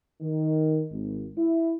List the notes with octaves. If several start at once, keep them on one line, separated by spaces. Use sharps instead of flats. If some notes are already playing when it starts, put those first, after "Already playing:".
D#3
G#1
E4